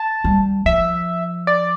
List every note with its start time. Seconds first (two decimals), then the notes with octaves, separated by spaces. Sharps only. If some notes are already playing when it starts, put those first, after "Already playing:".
Already playing: A5
0.24 G3
0.65 F3 E5
1.47 D5